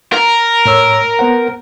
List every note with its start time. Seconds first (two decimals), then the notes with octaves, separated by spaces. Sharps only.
0.13 A#4
0.66 A2 C#5 E6
1.19 B3 C5 F#5